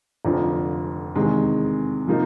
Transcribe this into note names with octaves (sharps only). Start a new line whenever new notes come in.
F1 F2 D3 F3
E2 C3 D#3 G#3
C3 F3 A#3 D#4